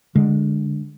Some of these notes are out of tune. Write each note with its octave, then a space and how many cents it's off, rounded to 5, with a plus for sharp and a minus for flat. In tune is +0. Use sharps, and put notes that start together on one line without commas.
D3 +0 G#3 -10